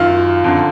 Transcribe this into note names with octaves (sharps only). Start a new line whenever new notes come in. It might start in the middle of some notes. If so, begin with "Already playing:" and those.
Already playing: F#2 D#3 F4
F2 D3